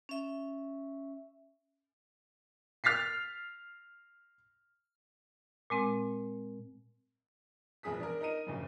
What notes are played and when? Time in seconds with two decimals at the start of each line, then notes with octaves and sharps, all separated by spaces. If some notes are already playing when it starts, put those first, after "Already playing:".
0.09 C#4 E5
2.84 F6 A6 B6 C7
5.70 A#2 G#3 C4
7.83 E1 A#1 G#4 D#6 B6
8.00 D4 A#4
8.21 D#4 A#4 A#5 D#7
8.47 F#1 D2 C#3